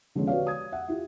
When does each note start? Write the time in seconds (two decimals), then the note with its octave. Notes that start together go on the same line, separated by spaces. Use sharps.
0.15 D3 F3 G#3 B3 C#4
0.27 F#4 G4 B4 C#5 D5 F5
0.47 D#6 G#6
0.72 E5 F#5
0.88 E4 F4 G4